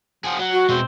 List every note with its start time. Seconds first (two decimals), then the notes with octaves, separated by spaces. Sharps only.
0.24 F3 F#4 G#4
0.39 F#3 F#5
0.52 F#4
0.69 B2 G#3 C4